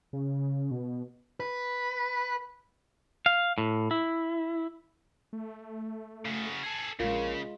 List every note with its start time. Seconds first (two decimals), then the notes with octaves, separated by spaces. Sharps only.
0.13 C#3
0.71 B2
1.40 B4
3.26 F5
3.58 A2
3.91 E4
5.33 A3
6.25 C#3 F#4
6.63 G#4 A4
7.00 A#1 C#3 G#3 F4 A#4